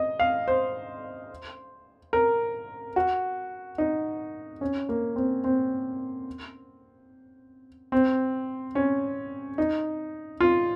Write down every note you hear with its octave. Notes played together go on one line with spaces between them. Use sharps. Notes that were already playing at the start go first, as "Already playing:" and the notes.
Already playing: D#5
F5
C5
A#4
F#4
D#4
C#4
A#3
C4
C4
C4
C#4
D#4
F4